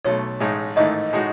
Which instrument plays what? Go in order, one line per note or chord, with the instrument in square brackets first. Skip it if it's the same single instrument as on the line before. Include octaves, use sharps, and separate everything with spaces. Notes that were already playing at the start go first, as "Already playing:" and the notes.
[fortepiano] B1 B2 A3 [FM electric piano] C#5
[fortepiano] A1 A2 G#3 D#4
[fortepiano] A1 G#2 D#3 A3 E4 [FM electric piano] D#5
[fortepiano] A2 G#3 D#4 F#4